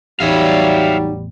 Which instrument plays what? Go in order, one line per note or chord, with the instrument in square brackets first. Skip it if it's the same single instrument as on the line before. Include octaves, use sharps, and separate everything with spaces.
[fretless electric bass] A1 E2 [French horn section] F#3 G3 [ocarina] D#4 [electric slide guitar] C#5 E5 F5